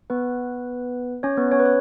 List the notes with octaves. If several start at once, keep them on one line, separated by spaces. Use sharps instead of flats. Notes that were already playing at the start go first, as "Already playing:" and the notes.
B3 B4
C#4 C#5
B3 B4
C#4 C#5
B4
C#5